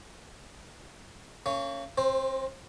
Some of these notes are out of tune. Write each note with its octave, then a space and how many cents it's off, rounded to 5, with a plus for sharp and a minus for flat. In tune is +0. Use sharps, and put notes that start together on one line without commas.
A#3 -35 C#4 +0
C4 +35 C5 +0